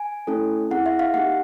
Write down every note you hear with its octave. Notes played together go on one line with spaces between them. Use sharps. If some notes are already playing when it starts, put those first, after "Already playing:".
Already playing: G#5
A3 C#4 E4 A4
C4 E4 G#4 F#5
E5
F5
A#3 D#4 G4 F#5